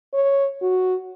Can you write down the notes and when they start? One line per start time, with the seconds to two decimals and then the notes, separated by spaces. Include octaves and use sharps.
0.14 C#5
0.62 F#4